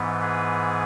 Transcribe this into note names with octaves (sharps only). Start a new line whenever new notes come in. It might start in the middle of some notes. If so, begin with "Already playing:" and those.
Already playing: G#2 E3 B3
G#4 B4